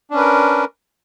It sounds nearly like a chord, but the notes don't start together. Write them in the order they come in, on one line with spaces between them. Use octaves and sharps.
D4 C#4 B4 A#4